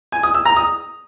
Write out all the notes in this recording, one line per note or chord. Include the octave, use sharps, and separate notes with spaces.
G#5
D#6
E6
A#5
D#6